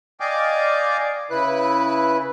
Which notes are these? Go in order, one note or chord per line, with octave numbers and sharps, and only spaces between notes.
D5 D#5 F5 G5 G#5 D6
C#3 E4 B4 F#6